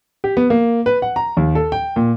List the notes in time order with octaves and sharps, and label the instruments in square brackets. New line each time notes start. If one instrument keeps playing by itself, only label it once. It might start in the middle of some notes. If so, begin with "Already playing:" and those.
[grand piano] G4
B3
A#3
B4
F#5
A#5
D#2
A4
G5
A#2